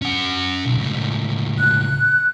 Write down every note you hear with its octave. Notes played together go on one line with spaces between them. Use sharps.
C#4 F#5
B1
C#2 A2
F#6